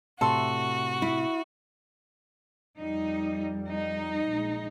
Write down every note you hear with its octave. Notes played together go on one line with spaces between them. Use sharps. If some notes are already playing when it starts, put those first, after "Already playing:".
A2 C3 F#4 A4 E5 C6
E4
F2 G3 D#4
D#4
A#1 G#3